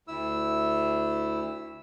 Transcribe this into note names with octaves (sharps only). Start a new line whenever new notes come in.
D2 E4 E6